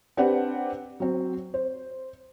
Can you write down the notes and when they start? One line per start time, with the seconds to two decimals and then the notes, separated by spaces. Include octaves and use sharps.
0.17 C4 D4 G4 B4 D5 F#5
1.00 F#3 C4
1.54 C5